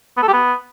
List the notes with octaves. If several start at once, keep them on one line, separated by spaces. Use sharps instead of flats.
B3
A4
G4
B3